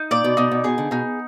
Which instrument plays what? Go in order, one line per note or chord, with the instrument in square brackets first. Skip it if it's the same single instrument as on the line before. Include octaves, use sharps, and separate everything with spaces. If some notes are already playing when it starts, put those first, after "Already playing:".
Already playing: [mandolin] D#4
[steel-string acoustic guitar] A#2 [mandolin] D5
[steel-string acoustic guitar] B2
[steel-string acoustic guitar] B2 [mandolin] D#4
[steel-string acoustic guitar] B2
[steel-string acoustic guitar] B2 [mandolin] G#4
[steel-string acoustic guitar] D3
[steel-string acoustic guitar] B2 [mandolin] D#4